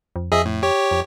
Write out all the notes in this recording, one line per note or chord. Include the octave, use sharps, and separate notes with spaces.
F2
F2 G#4 D#5 E5
A2
G4 C#5
F2